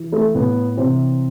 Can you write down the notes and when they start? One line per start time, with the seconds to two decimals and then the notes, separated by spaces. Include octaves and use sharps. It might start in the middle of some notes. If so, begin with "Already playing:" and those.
Already playing: E3
0.12 A3
0.35 A2 B3
0.77 C3 E3 C4